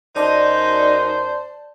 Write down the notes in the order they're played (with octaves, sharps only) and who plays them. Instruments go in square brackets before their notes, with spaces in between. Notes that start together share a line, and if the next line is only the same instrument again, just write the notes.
[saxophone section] F#2 D#4 [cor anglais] C5 [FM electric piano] D5 A5